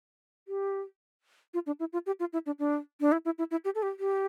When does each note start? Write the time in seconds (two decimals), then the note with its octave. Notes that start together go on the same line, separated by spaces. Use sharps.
0.48 G4
1.54 F4
1.66 D4
1.80 E4
1.93 F4
2.06 G4
2.20 F4
2.33 E4
2.46 D4
2.59 D4
3.00 D4
3.12 E4
3.25 E4
3.38 E4
3.51 E4
3.65 G4
3.75 A4
3.83 G4
4.00 G4